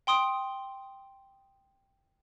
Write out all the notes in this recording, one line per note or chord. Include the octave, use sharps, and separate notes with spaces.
G5 C6 D#6 D7